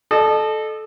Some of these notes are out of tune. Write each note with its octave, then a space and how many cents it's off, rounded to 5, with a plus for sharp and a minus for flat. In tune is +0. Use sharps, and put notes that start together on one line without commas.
A4 -15 D#5 -40